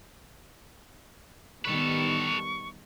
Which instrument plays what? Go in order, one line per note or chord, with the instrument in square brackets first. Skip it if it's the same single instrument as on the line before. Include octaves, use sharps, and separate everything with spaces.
[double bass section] D#3 G3 B3 [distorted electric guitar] A4 B4 [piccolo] C#6